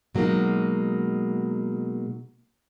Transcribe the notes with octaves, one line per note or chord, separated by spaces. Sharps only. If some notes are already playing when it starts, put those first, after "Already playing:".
B2 F#3 G#3 A#3 D#4